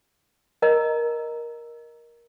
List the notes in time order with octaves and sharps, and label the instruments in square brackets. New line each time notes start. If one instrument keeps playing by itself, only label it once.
[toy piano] A#4 D#5 A#5